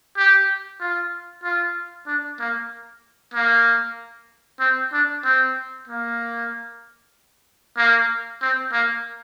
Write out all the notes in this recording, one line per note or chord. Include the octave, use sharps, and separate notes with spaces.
G4
F4
F4
D4
A#3
A#3
C4
D4
C4
A#3
A#3
C4
A#3